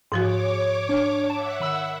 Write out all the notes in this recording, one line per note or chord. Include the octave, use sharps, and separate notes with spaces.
G#2 F3 F#4 G#4 C#5 D6
D4
E5 F#5 A5 D6
D#3 B5 E6